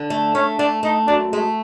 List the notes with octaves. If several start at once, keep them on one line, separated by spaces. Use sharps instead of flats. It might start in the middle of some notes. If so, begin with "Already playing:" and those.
Already playing: D3
A3
A3 C#4
A3 D4
A3 D#4
F#2 D4
G#3 A3